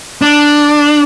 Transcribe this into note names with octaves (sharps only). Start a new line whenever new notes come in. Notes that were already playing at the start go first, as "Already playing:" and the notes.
D4